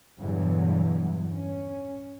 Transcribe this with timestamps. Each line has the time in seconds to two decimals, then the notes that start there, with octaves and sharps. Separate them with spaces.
0.19 E2 G2 B2 D3 E3 F#3
1.32 C#4